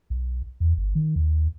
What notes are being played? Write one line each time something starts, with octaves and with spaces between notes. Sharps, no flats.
B1
E2
G1
D#3
D#2